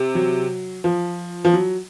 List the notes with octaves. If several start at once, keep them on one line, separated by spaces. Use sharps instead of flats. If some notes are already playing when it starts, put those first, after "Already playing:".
Already playing: C3
F#3
F3
F3
F#3